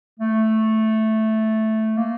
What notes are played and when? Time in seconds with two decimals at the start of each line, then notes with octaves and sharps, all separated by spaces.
0.20 A3
1.97 A#3